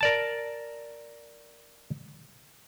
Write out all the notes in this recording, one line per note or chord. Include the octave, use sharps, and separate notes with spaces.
A#4 D5 A5